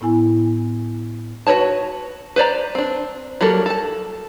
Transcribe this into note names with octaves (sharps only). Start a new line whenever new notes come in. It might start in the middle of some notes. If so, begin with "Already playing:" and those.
A2 B3 E4 G#5
F#4 A#4 B4 C#5 A5
B4 C5 D5 A#5
C4 D4
F#3 G3 A#3 A4 A#4
A4 A5